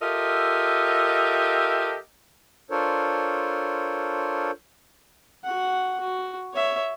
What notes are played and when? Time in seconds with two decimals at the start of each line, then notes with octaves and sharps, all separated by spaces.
0.01 F4 G4 A4 A#4 D#5 E5
2.71 D4 F4 A4 A#4 C5 C#5
5.44 F#4 F#5
6.00 F#4
6.54 C#5 E5